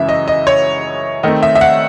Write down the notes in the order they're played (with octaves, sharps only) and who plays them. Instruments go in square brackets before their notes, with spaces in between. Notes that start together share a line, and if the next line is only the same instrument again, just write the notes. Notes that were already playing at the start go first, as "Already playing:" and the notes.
Already playing: [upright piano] F#2 C#3 E3 G#3 E5
D#5
D#5
C#5
D#3 A3 C4 D#5
E5
E5
F#5